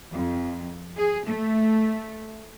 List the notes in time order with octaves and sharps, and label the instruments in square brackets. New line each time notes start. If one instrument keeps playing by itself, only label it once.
[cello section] F2
G#4
A3